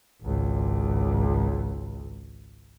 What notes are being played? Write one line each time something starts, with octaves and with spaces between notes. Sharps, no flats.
G#1 C#2